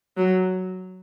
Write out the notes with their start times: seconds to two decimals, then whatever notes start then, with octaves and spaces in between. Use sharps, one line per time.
0.17 F#3